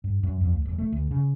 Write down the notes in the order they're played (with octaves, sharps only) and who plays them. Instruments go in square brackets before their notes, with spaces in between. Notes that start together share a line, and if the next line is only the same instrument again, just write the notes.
[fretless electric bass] G2
F#2
F2
D2
E1
A3
D2
C#3